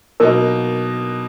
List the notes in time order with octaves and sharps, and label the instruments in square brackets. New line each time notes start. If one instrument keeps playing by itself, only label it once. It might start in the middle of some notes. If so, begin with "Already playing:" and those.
[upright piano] B2 F#3 A#3 D#4 [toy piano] A#4